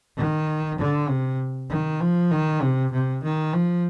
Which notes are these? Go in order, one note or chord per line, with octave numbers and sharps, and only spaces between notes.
D#3
D3
C3
D#3
F3
D#3
C3
C3
D#3
F3